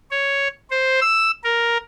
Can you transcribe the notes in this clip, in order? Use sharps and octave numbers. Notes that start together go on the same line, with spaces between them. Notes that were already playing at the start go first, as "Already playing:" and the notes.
C#5
C5
E6
A#4